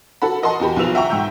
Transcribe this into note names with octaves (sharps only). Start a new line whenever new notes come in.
F#4 A4 F#5 B5
A#4 D#5 F#5 A5 C6
E2 F#4 G4 B5
B1 B2 F3 E6 E7 F7
E5 F#5 G5 A#5 C#6 E6
G#2 G5 E6 G6